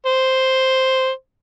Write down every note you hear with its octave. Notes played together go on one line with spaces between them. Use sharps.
C5